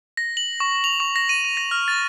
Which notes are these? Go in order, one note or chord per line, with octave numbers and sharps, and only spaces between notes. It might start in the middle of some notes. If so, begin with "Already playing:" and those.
A#6
F#7
C#6
F7
C#6
A#6
D#7
D#7
A#6
F6
A6